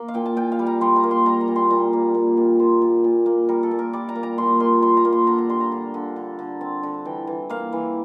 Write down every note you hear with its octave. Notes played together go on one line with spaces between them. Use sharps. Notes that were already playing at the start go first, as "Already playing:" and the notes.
Already playing: A#3
F5
A#2 G5
A5
A#2 G5
F5
G3
A#5
G3 C6
A#5
A#3
C6
G3 A#5
A#5
A#2
C6
A#2 A#5
A#3
A#2
A#2
A#2 C5
A#2
A#2
A#3
G3 A#4
A4
A#2
A#4
G3 D5
A#5
A#3
A#5
A#2 C6
A#2 C6
G3 C6
A#5
A#3
C6
D3 A#5
A#5
G3 C6
A#5
D3
D3
D3
D3
C4 A5
D3
E3 G5
E3
A#3 F5
E3